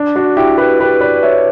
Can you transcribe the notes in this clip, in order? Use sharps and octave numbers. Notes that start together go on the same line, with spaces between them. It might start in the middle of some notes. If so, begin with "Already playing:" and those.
Already playing: D4
D4 F#4
E4 G4
G4 B4
G4 B4
B4 D5
C#5 E5